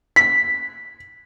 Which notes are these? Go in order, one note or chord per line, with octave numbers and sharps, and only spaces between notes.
B6